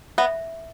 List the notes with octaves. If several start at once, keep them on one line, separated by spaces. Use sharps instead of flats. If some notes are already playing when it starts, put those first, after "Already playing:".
B3 E5